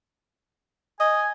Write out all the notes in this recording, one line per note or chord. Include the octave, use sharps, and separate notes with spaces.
D#5 G#5